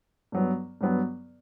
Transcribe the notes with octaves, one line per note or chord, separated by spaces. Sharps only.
G2 F#3 B3
G2 F#3 B3